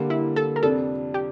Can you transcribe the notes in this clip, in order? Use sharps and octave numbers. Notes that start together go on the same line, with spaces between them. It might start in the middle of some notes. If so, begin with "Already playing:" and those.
Already playing: D3 G3 A#3
E4
A4
A#4
F2 C3 G3 D4 A4
G4